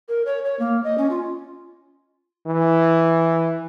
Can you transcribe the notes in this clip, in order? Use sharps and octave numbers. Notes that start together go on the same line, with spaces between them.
A#4
C#5
C#5
A#3
D#5
C#4
F4
E3